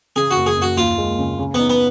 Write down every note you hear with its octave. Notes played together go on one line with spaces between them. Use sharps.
C#3 G#4
F#4
F#1
G#4
F#1 F#4
D#2 F4
G#3
C#3
C#3
B3 D#4
B3